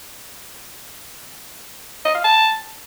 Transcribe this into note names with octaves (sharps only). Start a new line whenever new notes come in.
D#5
F5
A5